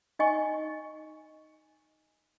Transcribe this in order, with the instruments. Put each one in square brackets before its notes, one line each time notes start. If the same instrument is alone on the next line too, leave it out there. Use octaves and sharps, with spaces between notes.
[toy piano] D#4 D#5 G#5 C#6